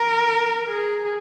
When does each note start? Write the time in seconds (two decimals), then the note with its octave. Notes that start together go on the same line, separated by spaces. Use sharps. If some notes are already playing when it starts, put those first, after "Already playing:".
Already playing: A#4
0.70 G#4